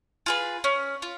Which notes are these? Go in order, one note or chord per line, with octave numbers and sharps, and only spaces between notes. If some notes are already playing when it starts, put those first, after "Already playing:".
F4 G#4 B4
C#4
F4